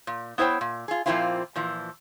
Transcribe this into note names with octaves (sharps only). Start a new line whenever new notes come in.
A#2
B3 E4 C5 C#5 G5
A#2
F4 G#4
A#2 F3 A#3 C4 E4 F4
A#2 E3 F3